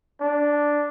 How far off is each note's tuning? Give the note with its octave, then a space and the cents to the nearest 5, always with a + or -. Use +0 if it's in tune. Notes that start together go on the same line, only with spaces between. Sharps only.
D4 +0